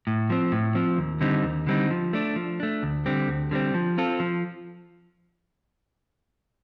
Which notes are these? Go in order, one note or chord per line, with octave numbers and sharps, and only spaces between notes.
A2
F3 C4
A2
F3 C4
D#2
D3 G3 C4 D#4
D#2
D3 G3 C4 D#4
F3
A3 D4
F3
A3 D4
D2
D3 G3 C4
D2
D3 G3 C4
F3
C4 F4 A4
F3